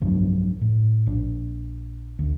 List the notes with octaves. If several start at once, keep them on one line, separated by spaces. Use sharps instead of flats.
B1 G2 F3 F#3
A2
A#1 D4
D2